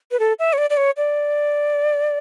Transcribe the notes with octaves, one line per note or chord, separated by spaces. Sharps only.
B4
A4
E5
C#5
D5
D5
C#5
D5